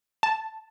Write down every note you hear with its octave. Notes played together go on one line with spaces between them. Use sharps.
A5